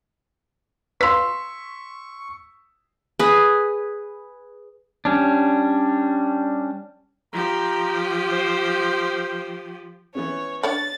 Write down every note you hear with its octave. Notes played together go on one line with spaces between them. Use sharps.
B4 F5 C6 C#6 E6 B6
G#4 B4
G3 C#4 D4
F3 G4 A#5
C5
E3 B3 C#4 C#5
D4 C#5 D5 A6